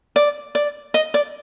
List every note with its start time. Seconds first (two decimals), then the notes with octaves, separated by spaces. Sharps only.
0.16 D5
0.55 D5
0.94 D#5
1.14 D5